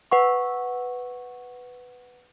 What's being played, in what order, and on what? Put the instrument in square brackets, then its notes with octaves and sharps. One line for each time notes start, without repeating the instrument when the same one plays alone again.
[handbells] B4 F#5 C#6